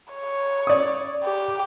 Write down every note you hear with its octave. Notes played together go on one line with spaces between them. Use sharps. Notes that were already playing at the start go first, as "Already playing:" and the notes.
C#5
D5 D#6
G4